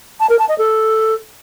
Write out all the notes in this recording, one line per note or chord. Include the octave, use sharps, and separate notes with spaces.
A5
A#4
A5
D#5
A4